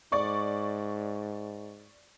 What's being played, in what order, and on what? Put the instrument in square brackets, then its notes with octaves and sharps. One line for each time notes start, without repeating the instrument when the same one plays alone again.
[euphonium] G#2 [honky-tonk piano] D5 C#6